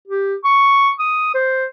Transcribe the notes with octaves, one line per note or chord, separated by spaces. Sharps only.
G4
C#6
D#6
C5